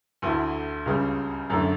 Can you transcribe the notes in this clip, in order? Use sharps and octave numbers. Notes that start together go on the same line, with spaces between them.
D2 D3 A3 E4
C#2 C#3 G3
F#2 D3 A3 D4